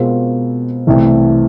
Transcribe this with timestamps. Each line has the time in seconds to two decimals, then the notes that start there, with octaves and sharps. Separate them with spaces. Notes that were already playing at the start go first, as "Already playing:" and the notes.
Already playing: B2 G#3 C4 F4 A#4
0.87 C2 C3 E3 A3